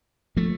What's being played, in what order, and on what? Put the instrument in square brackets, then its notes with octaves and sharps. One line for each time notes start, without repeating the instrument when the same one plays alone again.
[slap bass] F3 A3